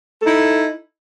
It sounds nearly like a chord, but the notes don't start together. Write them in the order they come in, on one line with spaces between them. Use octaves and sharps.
A4 D#4 E4